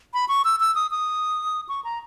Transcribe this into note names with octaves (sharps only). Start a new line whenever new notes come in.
B5
C#6
E6
E6
D#6
D#6
C#6
A#5